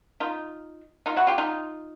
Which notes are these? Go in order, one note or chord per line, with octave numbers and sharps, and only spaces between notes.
D#4 F4
D#4 F4
E4 F#4
F4 G4
D#4 F4